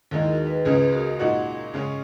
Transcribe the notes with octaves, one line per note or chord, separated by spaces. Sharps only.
D#2 D#3 G#3 D#4 E4 G#4
G#4
F#4 A#4
G#4 B4
C#2 C#3 G#3 G#4 B4
G#4
F#4 A#4
A#2 G#3 D#4 F#4
C#3 G#3 C#4